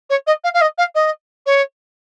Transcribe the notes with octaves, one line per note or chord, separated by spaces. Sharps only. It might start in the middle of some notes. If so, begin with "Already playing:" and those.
C#5
D#5
F5
F5
D#5
F5
D#5
C#5